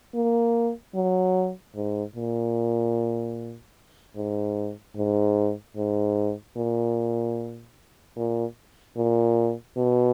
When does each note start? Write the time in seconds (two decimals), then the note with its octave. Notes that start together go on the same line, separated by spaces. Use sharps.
0.15 A#3
0.95 F#3
1.75 G#2
2.15 A#2
4.16 G#2
4.96 G#2
5.76 G#2
6.57 A#2
8.17 A#2
8.97 A#2
9.77 B2